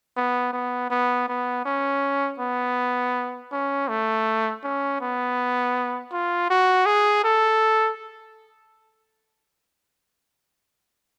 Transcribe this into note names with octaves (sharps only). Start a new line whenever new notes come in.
B3
B3
B3
B3
C#4
B3
C#4
A3
C#4
B3
F4
F#4
G#4
A4